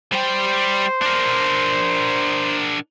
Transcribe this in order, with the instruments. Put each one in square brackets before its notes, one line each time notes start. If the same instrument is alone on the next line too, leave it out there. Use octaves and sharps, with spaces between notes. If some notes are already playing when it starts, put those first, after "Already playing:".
[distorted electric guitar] G3 G5 [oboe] C5
[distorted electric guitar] D4 A#4